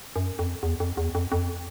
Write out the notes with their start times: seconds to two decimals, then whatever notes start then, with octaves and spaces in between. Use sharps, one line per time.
0.16 F#2
0.39 F2
0.63 E2
0.80 F2
0.97 E2
1.15 F2
1.32 F2